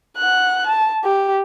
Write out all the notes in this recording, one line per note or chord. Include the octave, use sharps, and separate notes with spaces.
F#5 F#6
A5
G4